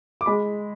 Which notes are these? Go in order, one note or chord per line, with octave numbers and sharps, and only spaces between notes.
D6
G#3 B5